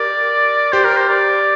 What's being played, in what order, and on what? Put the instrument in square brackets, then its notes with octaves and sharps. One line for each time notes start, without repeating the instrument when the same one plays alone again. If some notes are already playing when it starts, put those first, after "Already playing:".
Already playing: [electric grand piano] G4 A#4 [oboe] D5
[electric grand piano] G4 [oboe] C5
[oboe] A#4
C5
D5